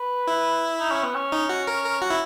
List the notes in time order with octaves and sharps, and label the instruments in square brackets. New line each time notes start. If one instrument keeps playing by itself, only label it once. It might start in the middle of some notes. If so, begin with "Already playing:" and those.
Already playing: [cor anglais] B4
[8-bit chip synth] E4
[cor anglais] D#4
C#4
B3
C#4
[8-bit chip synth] D#4
F#4
A#4
A#4
F#4
E4